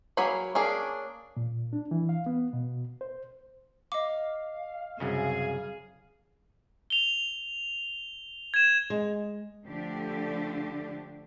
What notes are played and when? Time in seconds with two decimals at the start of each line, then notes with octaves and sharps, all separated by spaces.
0.17 F#3 A#3 G#4 G#5 B5
0.55 A#3 C#4 D4 G#4
1.37 A#2
1.73 D4
1.91 E3
2.09 F5
2.26 B3
2.53 B2
3.01 C5
3.92 D#5 F5 D6
5.00 C2 F#2 C#3 G#4
6.90 F7 G7
8.54 G#6 E7
8.90 G#3
9.67 D3 F3 A3 D4 G4